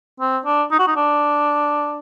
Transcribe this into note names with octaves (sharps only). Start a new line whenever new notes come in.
C4
D4
D#4
F#4
D#4
D4